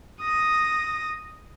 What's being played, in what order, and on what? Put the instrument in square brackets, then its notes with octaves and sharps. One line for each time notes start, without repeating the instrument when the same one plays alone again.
[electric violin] D#6 A#6